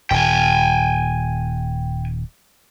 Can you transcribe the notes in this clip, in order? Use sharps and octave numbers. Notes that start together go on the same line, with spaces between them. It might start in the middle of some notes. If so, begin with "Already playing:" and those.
D#1 G5 G#5